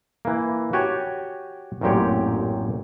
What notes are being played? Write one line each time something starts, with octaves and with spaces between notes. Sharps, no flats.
E3 A#3
F#4 G4 C#5 G#5 A5
A1 F#2 A#2 C4 G4 C#5